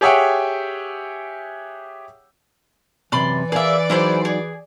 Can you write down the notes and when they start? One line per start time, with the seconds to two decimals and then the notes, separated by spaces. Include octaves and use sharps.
0.01 G4 G#4 C#5 E5 F#5 G5
3.12 F#2 C3 E3 D5 B5 C6
3.52 G#4 A#4 D5 E5 F5
3.90 F#3 D#4 E4 G#4 C5
4.25 G#4